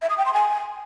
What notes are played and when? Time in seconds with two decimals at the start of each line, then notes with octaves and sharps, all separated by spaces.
0.02 E5
0.10 D#6
0.18 G5
0.25 C6
0.33 G#5